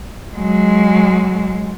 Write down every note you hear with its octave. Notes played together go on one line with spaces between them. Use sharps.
F#3 G#3